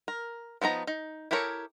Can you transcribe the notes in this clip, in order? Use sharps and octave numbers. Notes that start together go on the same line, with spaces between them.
A#4
F3 B3 D#4 A#5
D#4
E4 G4 A4 A#4 C#5